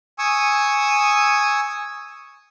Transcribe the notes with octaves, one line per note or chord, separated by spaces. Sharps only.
G#5 C#6 D#6 E6